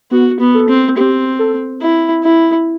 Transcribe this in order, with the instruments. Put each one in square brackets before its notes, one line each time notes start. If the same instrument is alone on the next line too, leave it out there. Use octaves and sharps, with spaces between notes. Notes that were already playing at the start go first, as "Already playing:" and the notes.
[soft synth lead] B3 [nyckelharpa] F#4
[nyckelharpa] B3
[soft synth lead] A4
[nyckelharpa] C4
[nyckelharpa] C4 [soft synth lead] G4
[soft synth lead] A4
[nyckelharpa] E4
E4